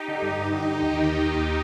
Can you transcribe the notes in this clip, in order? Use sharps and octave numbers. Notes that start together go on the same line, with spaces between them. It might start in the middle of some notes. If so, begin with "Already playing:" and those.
Already playing: D#4 G4
D3
G2
G2
D3
D3
D#2
D#3
D#3
D#2
D#3